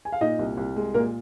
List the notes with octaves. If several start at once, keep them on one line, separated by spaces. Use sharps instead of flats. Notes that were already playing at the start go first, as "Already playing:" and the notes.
G#5
F5
A#2 D#4 D#5
C2
C2
G#3
A#2 A#3 A#4